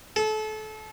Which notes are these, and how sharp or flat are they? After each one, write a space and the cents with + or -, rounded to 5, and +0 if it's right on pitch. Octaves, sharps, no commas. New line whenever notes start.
A4 -30